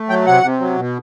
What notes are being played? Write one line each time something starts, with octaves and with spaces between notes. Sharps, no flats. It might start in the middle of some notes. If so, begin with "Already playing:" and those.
Already playing: A3
F#3 G5
C3 F#5
C3
F#3
B2